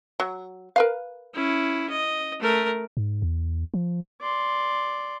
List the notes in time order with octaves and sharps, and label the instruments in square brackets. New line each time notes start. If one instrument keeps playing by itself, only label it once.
[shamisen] F#3
A#4 B4 F5
[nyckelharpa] C#4 E4
D#5
A3 A#4
[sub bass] G#2
E2
F3
[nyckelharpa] D5 C6